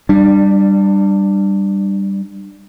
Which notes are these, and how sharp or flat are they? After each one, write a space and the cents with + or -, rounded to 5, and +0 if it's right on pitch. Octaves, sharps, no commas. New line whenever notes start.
G3 +0 D4 +25